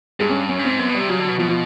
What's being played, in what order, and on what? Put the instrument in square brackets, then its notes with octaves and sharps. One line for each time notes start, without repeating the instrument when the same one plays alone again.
[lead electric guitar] G2 [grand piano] G#3
[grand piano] C#4
[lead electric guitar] F#2 [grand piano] C#4
[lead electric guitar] G2
[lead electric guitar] G#2 [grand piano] C4
[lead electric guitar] F#2 [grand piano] B3
[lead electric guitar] B2
[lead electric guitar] C3 [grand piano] G3
[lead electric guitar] C#3 [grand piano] F#3
[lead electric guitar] D3
[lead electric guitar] B2 [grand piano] F#3
[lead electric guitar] B2 [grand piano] F3
[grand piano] F3